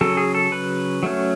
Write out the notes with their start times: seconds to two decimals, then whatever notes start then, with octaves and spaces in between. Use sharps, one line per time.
0.01 C#3 F#3 C#4 A4
0.17 G#4
0.35 A4
0.52 B4
1.03 F#3 A3 C#4